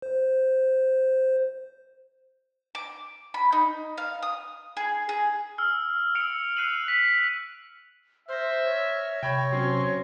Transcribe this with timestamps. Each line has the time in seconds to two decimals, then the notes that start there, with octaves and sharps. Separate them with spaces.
0.02 C5
2.75 D6
3.34 B5
3.52 D#4
3.98 F5
4.22 D#6
4.77 G#4
5.09 G#4
5.58 E6 F6
6.15 E6 C#7 D7 F7
6.57 F#6 C7 D#7 F7 F#7
6.88 B6
8.29 C5 E5 F6 A#6
8.65 C#5
9.23 C3 G5 B5 C#6 G#6 A#6
9.52 F#3 C4 C#4 C6